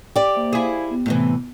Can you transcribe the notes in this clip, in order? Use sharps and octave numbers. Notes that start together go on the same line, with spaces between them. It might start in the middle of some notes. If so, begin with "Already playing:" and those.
G4 D5
A#3 C5 E5
E4 G#4 C5 F5
B3
A2 C3 E3